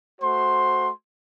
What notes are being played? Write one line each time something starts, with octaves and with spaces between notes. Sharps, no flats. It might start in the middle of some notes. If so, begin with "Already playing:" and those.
A3 F#4 C5 C6